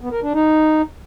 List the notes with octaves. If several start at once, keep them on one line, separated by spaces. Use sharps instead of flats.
B3
A#4
D4
D#4